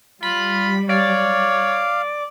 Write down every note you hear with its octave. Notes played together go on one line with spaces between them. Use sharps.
G3 F4 B5
C#5 D5 F5